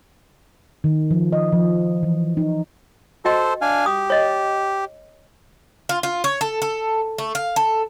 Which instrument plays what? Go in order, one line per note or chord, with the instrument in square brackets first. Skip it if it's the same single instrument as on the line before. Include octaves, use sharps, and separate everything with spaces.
[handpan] D#3
F3
D#5
F3
E3
D#4
[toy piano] F#4 D#5 G5 [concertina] A4 C5
[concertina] D4 F5 G#5
[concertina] G4 [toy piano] D#6
[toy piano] C#5 D#5
[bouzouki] F4
F4
C#5
A4
A4
A3
F5
A4